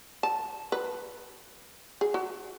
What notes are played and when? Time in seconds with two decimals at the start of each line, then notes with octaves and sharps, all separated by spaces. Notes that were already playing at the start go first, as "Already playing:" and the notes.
0.23 A5
0.72 B4
2.01 G#4
2.14 F#4